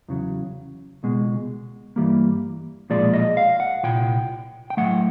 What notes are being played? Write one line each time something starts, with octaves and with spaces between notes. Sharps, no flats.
E2 C#3 F#3
C#2 B2 G#3
G2 E3 G3 A#3
B1 A#2 F3 G#3 D5
D#5
F5
F#5
C2 A#2 G5
G5
A2 F#3 A3 F#5